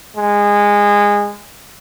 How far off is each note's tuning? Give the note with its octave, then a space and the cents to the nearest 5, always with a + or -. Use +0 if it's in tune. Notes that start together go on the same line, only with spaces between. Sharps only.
G#3 -20